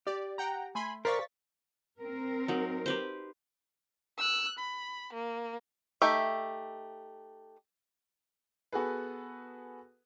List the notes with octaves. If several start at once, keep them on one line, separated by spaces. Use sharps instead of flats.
G4 D5
F#5 G5 A#5
A3 G#5 B5 C6
A#4 C5 D5 F5 C#6 A6 B6
C4 A#4
F#3 D#4
G4 B4 C5
E6 F#6
B5
A#3
A3 D#4 G4 E5
B3 F#4 G#4 A4 B4